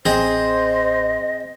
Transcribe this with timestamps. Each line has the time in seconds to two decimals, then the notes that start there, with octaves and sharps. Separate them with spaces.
0.05 A1 C4 G#4 C5 D#5